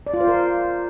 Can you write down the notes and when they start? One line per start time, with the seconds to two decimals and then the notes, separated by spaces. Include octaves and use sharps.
0.07 D5
0.14 F4
0.21 C5
0.28 A#4